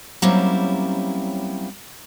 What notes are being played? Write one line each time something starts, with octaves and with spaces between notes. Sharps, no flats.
F#3 G3 A#3 C4 C#4 E4